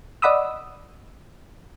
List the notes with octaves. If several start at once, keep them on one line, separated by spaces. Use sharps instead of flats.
D5 D#5 F#5 B5 D#6 E6